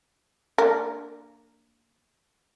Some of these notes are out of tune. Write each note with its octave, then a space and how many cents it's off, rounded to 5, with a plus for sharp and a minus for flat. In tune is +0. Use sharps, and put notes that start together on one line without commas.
A#3 -15 D4 +0 A#4 +0